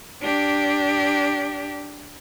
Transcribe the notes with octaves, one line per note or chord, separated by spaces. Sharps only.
D4 G4